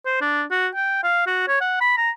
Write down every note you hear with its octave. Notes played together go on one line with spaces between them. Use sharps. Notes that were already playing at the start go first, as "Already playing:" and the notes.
C5
D4
F#4
G5
F5
F#4
C#5
F#5
B5
A#5